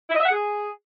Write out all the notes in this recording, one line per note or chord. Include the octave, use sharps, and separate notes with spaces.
E4
D#5
E5
F#5
G#4